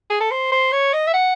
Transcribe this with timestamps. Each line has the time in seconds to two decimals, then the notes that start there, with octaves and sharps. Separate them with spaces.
0.10 G#4
0.20 A4
0.31 C5
0.52 C5
0.72 C#5
0.93 D#5
1.07 E5
1.14 F#5